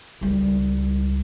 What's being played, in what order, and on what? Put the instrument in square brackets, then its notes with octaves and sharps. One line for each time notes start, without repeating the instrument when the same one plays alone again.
[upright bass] C#2 G3